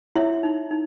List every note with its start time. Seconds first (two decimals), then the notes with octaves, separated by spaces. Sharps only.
0.16 E4 C#5 E5
0.43 D#4
0.71 D#4